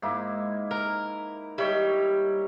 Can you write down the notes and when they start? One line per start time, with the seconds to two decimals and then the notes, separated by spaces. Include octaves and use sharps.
0.02 G#2 A#3 E4
0.71 A#4
1.58 G3 E4 C#5 D#5